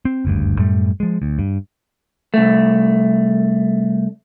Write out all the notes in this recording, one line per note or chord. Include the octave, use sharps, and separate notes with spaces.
C4
F#1 D2 G2
F#2 A2 G3 A3
F3 G#3
D2
G2
C2 A3